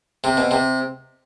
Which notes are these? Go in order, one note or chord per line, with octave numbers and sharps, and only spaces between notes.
C3
B2
C3